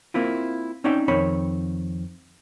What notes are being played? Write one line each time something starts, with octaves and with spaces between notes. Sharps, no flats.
A#3 C4 E4 F4
C4 C#4 D#4 D5 E5 G5
F2 D#3 C4 C#5 B5